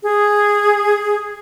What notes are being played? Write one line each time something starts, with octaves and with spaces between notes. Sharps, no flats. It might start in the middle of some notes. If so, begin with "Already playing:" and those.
G#4